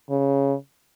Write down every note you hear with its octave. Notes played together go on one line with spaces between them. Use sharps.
C#3